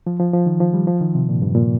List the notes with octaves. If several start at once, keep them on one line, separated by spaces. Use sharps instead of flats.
F3
F3
F3
D#3
F3
G3
F3
D#3
C3
A#2
G2
A#2